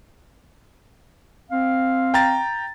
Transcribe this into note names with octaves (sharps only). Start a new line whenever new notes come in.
C4 F5
G5 A#5 A6